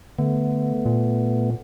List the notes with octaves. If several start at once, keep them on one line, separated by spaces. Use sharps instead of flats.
D3 A3 B3
A#2